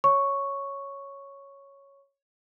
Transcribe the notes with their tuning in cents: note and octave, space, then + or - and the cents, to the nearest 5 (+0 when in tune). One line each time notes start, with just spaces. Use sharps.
C#5 +0 C#6 +0